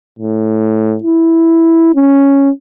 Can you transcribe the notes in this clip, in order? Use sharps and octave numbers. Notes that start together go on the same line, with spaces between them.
A2
E4
C#4